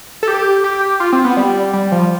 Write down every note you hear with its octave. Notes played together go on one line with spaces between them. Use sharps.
A4
G4
G4
F4
C4
B3
G3
G3
F3